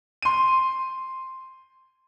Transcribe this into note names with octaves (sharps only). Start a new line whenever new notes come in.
C6 D#7